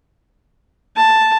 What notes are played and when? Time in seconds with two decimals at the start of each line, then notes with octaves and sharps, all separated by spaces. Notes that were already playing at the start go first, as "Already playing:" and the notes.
0.97 A5